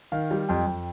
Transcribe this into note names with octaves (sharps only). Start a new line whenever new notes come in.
D#3 F5
G3
F2 G5
F2